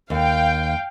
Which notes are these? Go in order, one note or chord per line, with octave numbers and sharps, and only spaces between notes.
D#2 F5 G5